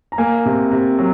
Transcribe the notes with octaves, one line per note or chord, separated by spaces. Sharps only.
A#5
A#3 G#5
C3
C3
F#3